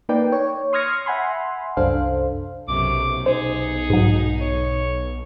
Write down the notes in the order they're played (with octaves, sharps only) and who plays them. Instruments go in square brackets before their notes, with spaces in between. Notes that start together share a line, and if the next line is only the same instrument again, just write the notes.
[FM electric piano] A#3 D#4 B4 D5 G5
C#5
C6 D#6 F6 G#6 A#6 C#7
E5 F#5 G#5 B5 C6
C2 F#2 D4 A4 C5 F5
[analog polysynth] B1 [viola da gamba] F#2 C3 [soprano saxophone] D6
[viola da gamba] D#4 [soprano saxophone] G#4 [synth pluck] C5
[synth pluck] G#2 F#3
[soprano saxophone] C#5